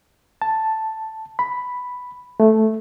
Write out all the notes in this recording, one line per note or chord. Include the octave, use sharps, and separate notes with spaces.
A5
B5
A3